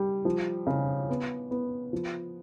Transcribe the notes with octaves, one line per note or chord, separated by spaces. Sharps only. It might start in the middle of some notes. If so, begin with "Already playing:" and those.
Already playing: G3
F3
C#3
B3
B3
F3